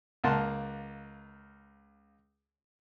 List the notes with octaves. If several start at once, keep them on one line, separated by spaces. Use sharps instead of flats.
C#2 A#3 F#5 A5 C6